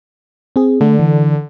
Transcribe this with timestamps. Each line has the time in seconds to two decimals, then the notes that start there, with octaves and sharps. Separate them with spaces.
0.56 C4 G#4
0.81 D3 A3
0.99 E3